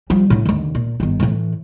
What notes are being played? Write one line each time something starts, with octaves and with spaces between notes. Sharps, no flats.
F3 G3
A2 D3
D#2 D3
A#2
G1 D#3
A2 E3